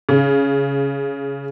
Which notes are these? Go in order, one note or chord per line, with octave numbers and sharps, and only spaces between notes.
C#3